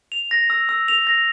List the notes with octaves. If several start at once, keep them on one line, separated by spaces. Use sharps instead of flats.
F7
A#6
E6
E6
F7
A#6